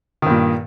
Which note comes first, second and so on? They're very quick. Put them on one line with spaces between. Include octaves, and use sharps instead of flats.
D#3 G2 A#2